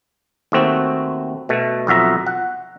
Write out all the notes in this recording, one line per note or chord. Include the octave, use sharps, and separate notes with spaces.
D#2 A3 C4 F#4
B2 A3
B1 F2 F#4 E5 A#5
F#5